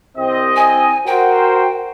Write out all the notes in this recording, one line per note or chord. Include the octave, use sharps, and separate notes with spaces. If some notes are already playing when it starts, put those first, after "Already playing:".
C2 C4 D#5
G#5
F#4 A#4 C5 G5